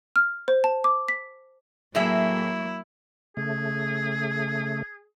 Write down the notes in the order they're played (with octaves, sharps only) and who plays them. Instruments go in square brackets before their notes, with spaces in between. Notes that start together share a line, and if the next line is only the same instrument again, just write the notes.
[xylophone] F6
C5
A5
D6
B6
[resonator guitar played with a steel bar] A2 G#4 E5 [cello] F#3 A#3 [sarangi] E4
[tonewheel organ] C#3 A3 [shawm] G#4